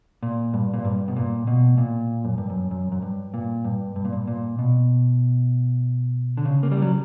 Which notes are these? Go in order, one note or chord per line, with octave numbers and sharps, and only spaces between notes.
A#2
G2
A#2
G2
B2
A#2
B2
A#2
F#2
G2
F#2
F#2
F#2
G2
A#2
G2
G2
A#2
G2
A#2
B2
D3
C#3
A#3
G3
F#3